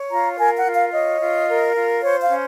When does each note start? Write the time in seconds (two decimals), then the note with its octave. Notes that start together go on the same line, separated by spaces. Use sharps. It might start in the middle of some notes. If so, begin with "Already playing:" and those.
Already playing: C#5
0.10 F4 A#5
0.38 A#4 G#5
0.56 F#5
0.66 F4
0.74 F5
0.92 C#5 D#5
1.20 F4
1.48 A#4
1.75 F4
2.02 C5 C#5
2.21 F5
2.30 C#4